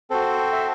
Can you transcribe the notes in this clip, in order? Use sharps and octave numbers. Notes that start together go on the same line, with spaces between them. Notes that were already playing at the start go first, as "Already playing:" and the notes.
C4 F#4 A4 C5
E5